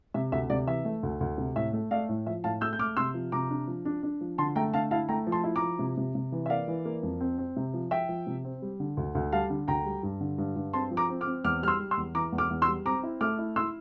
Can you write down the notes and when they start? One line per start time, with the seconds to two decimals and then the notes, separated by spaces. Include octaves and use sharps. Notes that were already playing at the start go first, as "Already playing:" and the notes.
0.14 C3 E5
0.32 D2 E5
0.50 C3 D5
0.67 E3 E5
0.85 A3
1.03 D2
1.20 D2
1.38 C3
1.56 A2 E5
1.73 A3
1.91 A3 D5 F5
2.09 A2
2.27 F3 E5
2.44 A2 F5 A5
2.61 A3 E6 G6
2.73 G6
2.79 A3 D6 F6
2.97 C3 C6 E6
3.14 F3
3.32 C3 A#5 D6
3.50 D4
3.68 F3
3.85 D4
4.03 D4
4.21 F3
4.38 D3 A5 C6
4.56 A3 G5 A#5
4.74 D3 F5 A5
4.91 E4 F5 A5
5.09 A3 G5 A#5
5.27 F3
5.32 A5 C6
5.44 E4
5.56 A#5 D6
5.62 F3
5.79 C3
5.97 C3
6.15 C3
6.32 E3
6.46 E5
6.50 A#3 D5 F5
6.68 E3
6.85 A#3
7.03 F2
7.21 C4
7.38 C4
7.56 C3
7.74 F3
7.91 F3 E5 G5
8.09 F3
8.27 C3
8.44 C4
8.62 G3
8.80 D3
8.97 D2
9.15 D2
9.32 G3 F5 A5
9.50 D3
9.68 D2 G5 A#5
9.85 G3
10.03 G2
10.21 D3
10.38 G2
10.56 G2
10.73 C4 A5 C6
10.91 F3
10.97 A#5 D6
11.09 C4
11.21 D6 F6
11.27 C4
11.44 E2 D6 F6
11.62 G3 F6
11.68 C6 E6
11.80 G3
11.91 C6 E6
11.97 E2
12.15 E3 A#5 D6
12.32 E2
12.38 D6 F6
12.51 E2
12.62 C6 E6
12.68 G3
12.86 C4 A#5 D6
13.03 E4
13.21 A3 D6 F6
13.38 E4
13.56 E4 C6 E6